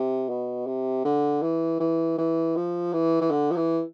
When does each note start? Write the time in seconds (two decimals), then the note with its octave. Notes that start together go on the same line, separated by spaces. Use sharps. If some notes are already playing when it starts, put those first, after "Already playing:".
Already playing: C3
0.29 B2
0.67 C3
1.05 D3
1.42 E3
1.80 E3
2.18 E3
2.56 F3
2.93 E3
3.21 E3
3.31 D3
3.51 F3
3.57 E3